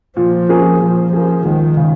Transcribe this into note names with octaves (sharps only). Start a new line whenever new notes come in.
A#2 F3
A#3 C#4 G#4
A#2 F3
F3 A#3 C#4 G#4
C#2 D#3
C#3